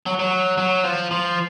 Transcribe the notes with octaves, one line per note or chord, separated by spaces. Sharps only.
F#3
F#3
F#3
F3
F3